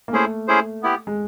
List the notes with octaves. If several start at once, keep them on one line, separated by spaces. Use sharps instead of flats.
A#3
A3 C#4 E4 G#4 C5
C#4 E4 G#4 C5
B3 E4 G4
G#3